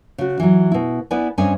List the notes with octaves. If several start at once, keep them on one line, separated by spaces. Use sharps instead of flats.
C#3 F#4
E3 F#3
B2 E4
B3 E4 B4 D5 G#5
G2 C4 C#4 D#5 G#5